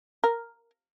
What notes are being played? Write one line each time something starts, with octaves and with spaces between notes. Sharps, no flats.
A#4